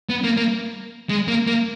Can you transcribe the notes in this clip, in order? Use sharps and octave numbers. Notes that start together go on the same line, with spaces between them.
B3
A#3
A#3
G#3
A#3
A#3